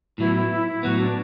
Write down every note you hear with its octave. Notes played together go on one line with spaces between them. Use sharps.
A2 F#3 B3 E4
E4
E4
E4
A2 F#3 B3 F#4
D4